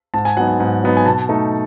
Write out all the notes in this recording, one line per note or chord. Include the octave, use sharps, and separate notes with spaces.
G#2 A5
G#5
F#3 B3 D#4 F#5
G#5
G#2
F#3 B3 D#4
G#5
B2 A5
A3 D#4